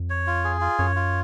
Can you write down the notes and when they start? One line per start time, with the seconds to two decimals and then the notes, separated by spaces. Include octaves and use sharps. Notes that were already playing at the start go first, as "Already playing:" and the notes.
Already playing: F2
0.10 C#5
0.27 F4
0.44 G#4
0.61 F4
0.79 F#2 C#5
0.96 F4